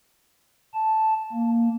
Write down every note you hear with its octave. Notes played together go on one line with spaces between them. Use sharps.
A5
A#3